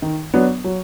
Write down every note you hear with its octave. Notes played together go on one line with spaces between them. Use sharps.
D#3
F#3 B3 D4
F#3